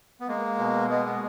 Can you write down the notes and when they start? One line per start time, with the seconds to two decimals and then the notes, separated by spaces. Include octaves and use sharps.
0.20 B3
0.28 G#3 A#3
0.59 B2
0.90 G#3 B3
1.06 B3